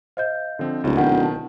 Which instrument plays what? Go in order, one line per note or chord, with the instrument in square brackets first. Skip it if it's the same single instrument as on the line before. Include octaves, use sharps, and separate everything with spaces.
[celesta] C5 D#5 G6 [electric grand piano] F5
[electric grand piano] D3 F3 C4
[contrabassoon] D1 [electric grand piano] C#2
[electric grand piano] B2 D#3 G5 [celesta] F#5
[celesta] A5